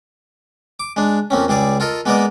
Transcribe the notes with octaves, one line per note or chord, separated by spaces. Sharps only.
D6
G#3 D4
F2 A#3 C4 C#4
C#2 G3 G#4 D5
F4 A4 A#4 D#5
G#3 A#3 B3 A#4 D5 D#5